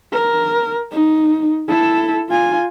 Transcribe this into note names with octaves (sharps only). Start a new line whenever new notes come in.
A#4
D#4
E4 A4
F4 G#5